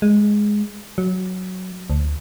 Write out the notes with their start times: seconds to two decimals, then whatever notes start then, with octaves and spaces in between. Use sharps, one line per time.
0.02 G#3
0.98 F#3
1.90 D2